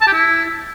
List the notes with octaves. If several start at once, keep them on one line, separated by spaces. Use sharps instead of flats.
A5
G4
E4